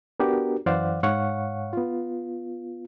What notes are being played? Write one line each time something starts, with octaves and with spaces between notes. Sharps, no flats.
B3 D4 F#4 G4 A#4
F#2 E3 C5 D5 F5 F#5
G#2 C#5 F5 F#5 C#6
B3 F4